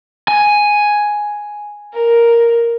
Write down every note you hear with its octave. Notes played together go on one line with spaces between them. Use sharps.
G#5
A#4